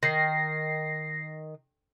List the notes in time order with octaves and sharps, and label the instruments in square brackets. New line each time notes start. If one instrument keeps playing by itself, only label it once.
[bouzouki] D#3 [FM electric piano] A#6 C7